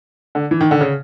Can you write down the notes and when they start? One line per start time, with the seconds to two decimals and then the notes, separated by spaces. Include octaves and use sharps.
0.35 D3
0.51 E3
0.61 D#3
0.71 D3
0.81 C#3